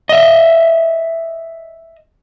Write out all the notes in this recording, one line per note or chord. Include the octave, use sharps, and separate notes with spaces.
D#5 E5